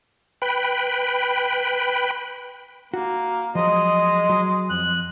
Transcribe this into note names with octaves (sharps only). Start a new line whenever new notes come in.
B4 G5 B5
A#3 F#4
F3 F#3 G#3 D#5
F#3
F2 F#6